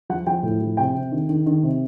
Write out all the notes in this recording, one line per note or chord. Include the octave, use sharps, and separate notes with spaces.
F3 F#5
F3 G5
A2
F3
C3 G5
C3
D#3
D#3
D#3
C3